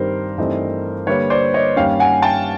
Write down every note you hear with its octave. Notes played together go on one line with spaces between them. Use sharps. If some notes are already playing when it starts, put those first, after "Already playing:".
Already playing: G2 D#3 G3 C4 A#4 C5
G2 E3 A3 C4 D#4
D3 G3 A#3 B4 C#5
C5 D5
C#5 D#5
G2 D#3 G3 A#3 C#4 F5 G5
F#5 G#5
G5 A5